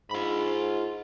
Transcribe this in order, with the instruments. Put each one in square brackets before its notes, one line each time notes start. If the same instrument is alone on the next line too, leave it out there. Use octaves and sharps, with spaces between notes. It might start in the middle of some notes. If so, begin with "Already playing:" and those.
[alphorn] G#2 [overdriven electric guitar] F4 B5